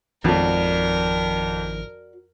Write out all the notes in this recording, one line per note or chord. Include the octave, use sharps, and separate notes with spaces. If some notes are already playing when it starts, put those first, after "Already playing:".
G#1 F2 D#3 F3 F#4 A#4 D5